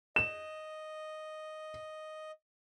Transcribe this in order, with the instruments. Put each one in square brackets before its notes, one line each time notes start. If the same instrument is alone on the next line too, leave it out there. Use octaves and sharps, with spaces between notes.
[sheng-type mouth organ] D#5 [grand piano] E7